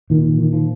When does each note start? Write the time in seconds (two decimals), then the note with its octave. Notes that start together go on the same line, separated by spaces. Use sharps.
0.10 A#2 D#3
0.39 D#3
0.53 F3